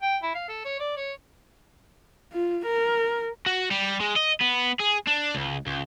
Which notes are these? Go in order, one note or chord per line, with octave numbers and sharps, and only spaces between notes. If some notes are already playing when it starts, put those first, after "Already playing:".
G5
E4
F5
A4
C#5
D5
C#5
F4
A#4
F#4
G3
G#3
D#5
B3
G#4
D4
C#2
C#2